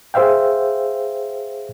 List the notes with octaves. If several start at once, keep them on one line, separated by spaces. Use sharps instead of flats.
G#4 C5 E5 F5 G5